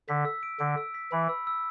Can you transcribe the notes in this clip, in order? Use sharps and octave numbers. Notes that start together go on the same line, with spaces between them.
D3 B6
E6
D7
D3 D7
E6
B6
E3 B5
E6
E6